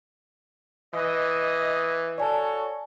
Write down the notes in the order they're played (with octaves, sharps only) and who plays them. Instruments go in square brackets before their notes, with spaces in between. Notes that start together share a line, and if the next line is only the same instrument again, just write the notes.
[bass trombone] E3 [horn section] D#5
[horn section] F#4 A4 C#5 [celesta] D5 G#5 A5